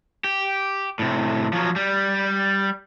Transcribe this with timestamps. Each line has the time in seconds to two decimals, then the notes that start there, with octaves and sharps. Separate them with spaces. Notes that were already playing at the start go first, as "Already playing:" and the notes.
0.24 G4
0.99 A2 C3
1.53 F3 F#3
1.76 G3